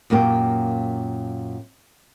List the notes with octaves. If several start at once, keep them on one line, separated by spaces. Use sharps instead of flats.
F#2 A#2 A#3 G4